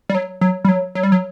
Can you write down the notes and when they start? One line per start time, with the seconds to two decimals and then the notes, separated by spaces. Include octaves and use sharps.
0.10 G3
0.15 F#3
0.41 F#3
0.65 G3
0.69 F#3
0.95 F#3
1.03 G3
1.12 F#3